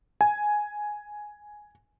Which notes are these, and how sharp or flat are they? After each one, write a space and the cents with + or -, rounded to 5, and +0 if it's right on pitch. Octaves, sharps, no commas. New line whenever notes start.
G#5 +5